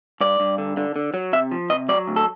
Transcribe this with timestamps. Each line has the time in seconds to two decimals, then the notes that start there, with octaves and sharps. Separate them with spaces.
0.21 G2 D5
0.40 G2
0.58 D3
0.77 D3
0.96 D3
1.14 F#3
1.33 C3 E5
1.51 F3
1.70 C3 D#5
1.89 F#3 D5
2.08 D2
2.16 A4